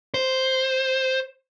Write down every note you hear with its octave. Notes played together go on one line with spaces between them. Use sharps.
C5